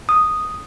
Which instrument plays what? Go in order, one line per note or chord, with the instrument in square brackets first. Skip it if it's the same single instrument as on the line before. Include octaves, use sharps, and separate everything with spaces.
[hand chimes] D#6